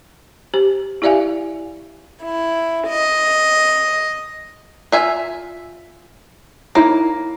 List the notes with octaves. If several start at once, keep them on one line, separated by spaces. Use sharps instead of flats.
G4 C5
E4 G4 D5 E5 F5 G#5
E4
D#5
F4 E5 G#5
A#3 D#4 E4 C#5